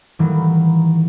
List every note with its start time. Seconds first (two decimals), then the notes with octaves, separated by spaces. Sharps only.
0.19 A2 D#3 E3 F#3 G3 A#3